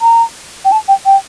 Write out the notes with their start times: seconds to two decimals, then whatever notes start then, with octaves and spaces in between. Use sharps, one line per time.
0.01 A#5
0.65 G5
0.72 A5
0.88 G5
1.06 G5